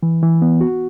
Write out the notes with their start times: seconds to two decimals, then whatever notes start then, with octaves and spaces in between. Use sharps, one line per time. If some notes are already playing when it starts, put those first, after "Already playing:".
0.03 E3
0.23 E3
0.42 B3
0.61 F#4